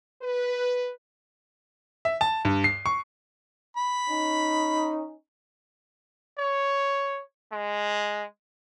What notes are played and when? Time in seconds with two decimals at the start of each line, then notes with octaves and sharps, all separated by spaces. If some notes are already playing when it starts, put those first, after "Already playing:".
0.22 B4
2.05 E5
2.21 A5
2.45 G2
2.64 C7
2.86 C#6
3.77 B5
4.08 C#4 D#4
6.39 C#5
7.53 G#3